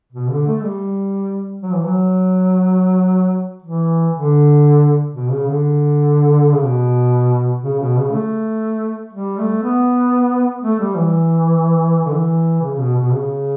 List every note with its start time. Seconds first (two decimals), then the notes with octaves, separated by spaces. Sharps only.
0.12 B2
0.30 D3
0.46 A3
0.63 G3
1.62 F#3
1.73 E3
1.85 F#3
3.63 E3
4.13 D3
5.13 B2
5.30 C#3
5.46 D3
6.53 C#3
6.63 B2
7.62 C#3
7.79 B2
7.96 C#3
8.12 A3
9.13 G3
9.38 A3
9.63 B3
10.63 A3
10.80 G3
10.95 E3
12.05 D3
12.12 E3
12.62 C#3
12.79 B2
12.96 B2
13.12 C#3